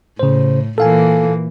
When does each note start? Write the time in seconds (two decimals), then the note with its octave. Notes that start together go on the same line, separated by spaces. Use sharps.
0.19 A2 C#3 C5
0.78 A#2 E3 A#3 A4 F5 G#5